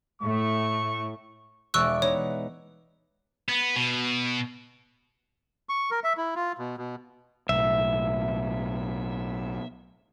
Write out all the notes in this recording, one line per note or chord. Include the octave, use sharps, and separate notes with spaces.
A2 A3 C#6
E1 G#3 D5 C#6 E6 F#6
B3 D#4 C#5
B3
B2
C#6
A#4
E5
E4
F4
B2
B2
B1 A2 E5